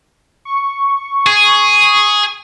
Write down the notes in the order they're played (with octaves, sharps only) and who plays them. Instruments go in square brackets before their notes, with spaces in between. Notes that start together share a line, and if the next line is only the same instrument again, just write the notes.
[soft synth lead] C#6
[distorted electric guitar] G#4